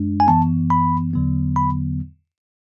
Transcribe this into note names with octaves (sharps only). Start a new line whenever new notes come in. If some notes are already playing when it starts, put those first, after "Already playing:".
Already playing: F#2 G#3 D4
G#5
F#2 E3 B3 A5
B5
E2 D3 F#3 B3
B5